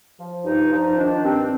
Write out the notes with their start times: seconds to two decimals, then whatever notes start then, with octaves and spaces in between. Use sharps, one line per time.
0.20 F3
0.45 G2 D#4
0.71 F3 D#4
0.98 D#3 D4
1.24 G2 C4